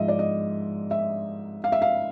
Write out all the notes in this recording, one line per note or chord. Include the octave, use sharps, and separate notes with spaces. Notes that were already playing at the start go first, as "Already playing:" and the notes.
Already playing: G#2 F3 D#5 E5
D5
D#5
E5
F5
E5
F5